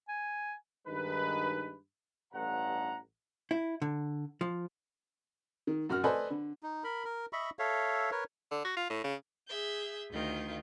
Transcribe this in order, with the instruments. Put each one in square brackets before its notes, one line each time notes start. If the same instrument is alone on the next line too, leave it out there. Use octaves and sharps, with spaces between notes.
[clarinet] G#5
[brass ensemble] G2 D#3 G#3 D#4 B4
A1 G2 F#5 A#5
[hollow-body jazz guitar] E4
D3
F3
[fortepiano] D#3
F#2 F#4 A#4 F6
A4 B4 C5 D5 D#5 G#5
D3
[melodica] D#4
A#4 B5
A#4
D#5 E5 B5 C#6
A4 C#5 E5 F5
A#4 B4 C#5
[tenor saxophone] D3
F#4
F4
A2
C#3
[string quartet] G#4 E5 G6
D2 D#3 F4 G6